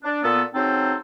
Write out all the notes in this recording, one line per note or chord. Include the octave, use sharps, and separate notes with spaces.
D4
A#2 B3 A4
C#3 F#3 C4 D#4 A4 C5